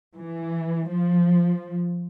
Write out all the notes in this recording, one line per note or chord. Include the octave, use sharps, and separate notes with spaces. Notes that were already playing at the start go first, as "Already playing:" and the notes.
E3
F3